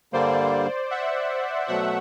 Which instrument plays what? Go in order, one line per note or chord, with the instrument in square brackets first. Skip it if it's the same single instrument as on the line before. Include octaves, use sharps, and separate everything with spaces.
[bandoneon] G2 D3 G3 A#3 [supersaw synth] C5 D5
[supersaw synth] E5 F#5
[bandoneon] B2 F#3 A3 [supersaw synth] E5 F#5